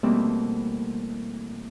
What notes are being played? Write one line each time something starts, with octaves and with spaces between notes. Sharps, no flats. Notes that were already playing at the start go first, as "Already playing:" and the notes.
B2 E3 G3 A3 A#3 C4